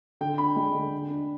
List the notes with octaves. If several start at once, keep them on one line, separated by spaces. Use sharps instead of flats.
D3 G5
D4 B5
G#3
D3
D3
D4